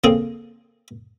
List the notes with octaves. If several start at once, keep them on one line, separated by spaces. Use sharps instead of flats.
C#3 A#3 C4 G#4 A4